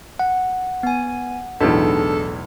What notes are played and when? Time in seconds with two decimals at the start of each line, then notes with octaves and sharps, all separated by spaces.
0.20 F#5
0.83 B3 G#5
1.61 B1 E2 A2 D4 D#4 G#4 A4